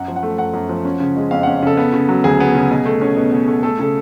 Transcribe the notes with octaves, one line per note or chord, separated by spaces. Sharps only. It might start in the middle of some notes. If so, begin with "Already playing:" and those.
Already playing: F#2 F#5
F3
F#5
A3
F#2 F#5
F#2
F3
C#4
C#3
G#3
F2 F5
C#4 F#5
C#3 A4
B3
C#3
F#3
D2 G#4
B3
C#3
B2
A3
C#4
B2
B2
A3
A3 A4
C#3 A4